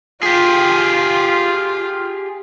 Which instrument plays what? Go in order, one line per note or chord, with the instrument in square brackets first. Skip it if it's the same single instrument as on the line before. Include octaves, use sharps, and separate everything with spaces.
[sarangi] F4 [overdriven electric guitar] G4 G#4